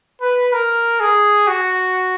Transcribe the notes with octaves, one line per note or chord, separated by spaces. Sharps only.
B4
A#4
G#4
F#4